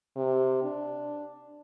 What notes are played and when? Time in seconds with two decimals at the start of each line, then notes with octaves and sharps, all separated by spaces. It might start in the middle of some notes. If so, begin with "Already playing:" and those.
0.16 C3
0.63 D4